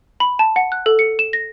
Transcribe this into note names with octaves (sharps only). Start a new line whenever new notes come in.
B5
A5
F#5
F#6
A4
C#7
E7
A#6